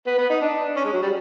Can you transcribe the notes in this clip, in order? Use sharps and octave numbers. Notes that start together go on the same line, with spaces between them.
B3
B3
D#4
D4
C#4
G#3
F#3
G3